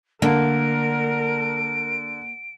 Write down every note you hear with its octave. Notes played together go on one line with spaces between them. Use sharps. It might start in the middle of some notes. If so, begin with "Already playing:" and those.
D3 A#3 A#4 D7